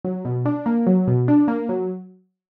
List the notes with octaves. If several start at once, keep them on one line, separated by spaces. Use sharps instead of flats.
F#3
B2
D4
A#3
F#3
B2
D4
A#3
F#3